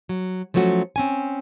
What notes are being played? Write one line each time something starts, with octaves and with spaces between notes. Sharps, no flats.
F#3
F3 F#3 A3 C#4 F#4
C4 C#4 G#5